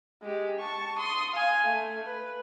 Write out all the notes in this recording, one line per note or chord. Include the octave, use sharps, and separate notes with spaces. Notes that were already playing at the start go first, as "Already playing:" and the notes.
G#3 G4
A5 C#6
C6 D#6
F5 G#5
A3
B4